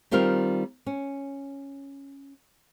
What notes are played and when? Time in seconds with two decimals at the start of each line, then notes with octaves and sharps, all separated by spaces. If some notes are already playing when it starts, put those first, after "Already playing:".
0.11 D#3 G3 C4 F4 A#4
0.86 C#4